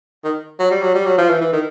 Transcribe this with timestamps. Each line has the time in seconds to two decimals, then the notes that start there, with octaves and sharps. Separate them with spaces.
0.24 D#3
0.59 F#3
0.71 G3
0.82 F#3
0.95 G3
1.06 F#3
1.18 F3
1.29 E3
1.41 E3
1.53 D#3